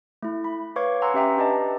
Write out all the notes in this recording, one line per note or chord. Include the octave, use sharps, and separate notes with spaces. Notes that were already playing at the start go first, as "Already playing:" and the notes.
A3 E4
B5
B4 C#5 F5 C#6 D6 G#6
F#5 G#5 A#5 C6 E6
C#4 G4 B4 E5 G5 A#5
D4 G4 B4 D5 D#5 A5